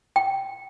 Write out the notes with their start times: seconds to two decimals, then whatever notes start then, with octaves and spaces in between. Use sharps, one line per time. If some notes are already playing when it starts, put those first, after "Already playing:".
0.16 G5